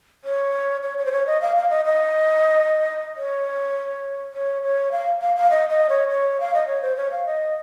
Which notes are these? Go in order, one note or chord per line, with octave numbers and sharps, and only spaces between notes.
C#5
C#5
C#5
C5
C#5
D#5
F5
F5
D#5
D#5
C#5
C#5
C#5
F5
F5
F5
D#5
D#5
C#5
C#5
F5
D#5
C#5
C5
C#5
F5
D#5